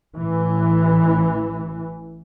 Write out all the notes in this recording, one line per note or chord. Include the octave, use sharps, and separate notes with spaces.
A1 E3